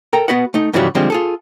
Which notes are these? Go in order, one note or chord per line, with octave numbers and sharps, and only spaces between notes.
A4 A#4 G5 A#5
B3 F#4 B4 D#5 F#5
A3 D#4
G#2 C#3 E3 F3 G3 F#4
D3 F3 G3 G#3 C4
F4 G#4 A4